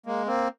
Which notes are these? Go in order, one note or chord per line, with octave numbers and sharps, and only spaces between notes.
G#3 A#3
A#3 C4